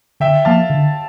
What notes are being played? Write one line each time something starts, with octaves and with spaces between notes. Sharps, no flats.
D3 E5 G5
F3 A#3 F5 A5
D3